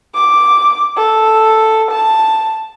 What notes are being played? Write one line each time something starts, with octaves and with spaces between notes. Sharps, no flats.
D6
A4
A5